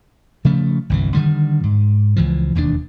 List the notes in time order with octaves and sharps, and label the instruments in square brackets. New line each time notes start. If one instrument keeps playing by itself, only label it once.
[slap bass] C#3 F3 A3
G1 C2 E3
D3 D#3 G3
G#2
C#2 E3 F3
E1 D#2 D3 D4